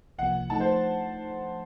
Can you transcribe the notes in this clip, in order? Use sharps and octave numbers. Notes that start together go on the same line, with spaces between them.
C2 C3 F3 A#3 F#5
F3 A3 D#4 A5
C5